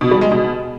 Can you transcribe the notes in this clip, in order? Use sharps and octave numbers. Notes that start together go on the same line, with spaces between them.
B2
G3
G#3
B2